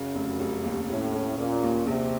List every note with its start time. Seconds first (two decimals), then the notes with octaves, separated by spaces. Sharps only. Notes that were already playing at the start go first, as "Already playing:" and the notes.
Already playing: F#2 C#3
0.15 F1
0.39 F1
0.64 D#2
0.89 A2 C#4
1.13 C#4
1.38 A#2 C#4
1.63 D#2
1.86 A#1 C3